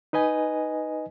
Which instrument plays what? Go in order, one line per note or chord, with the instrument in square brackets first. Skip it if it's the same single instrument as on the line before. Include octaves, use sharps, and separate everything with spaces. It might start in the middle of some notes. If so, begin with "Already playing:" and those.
[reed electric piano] D#4 B4 D#5 G#5